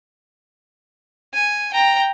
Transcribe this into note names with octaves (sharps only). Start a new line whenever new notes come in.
G#5
G5 A#5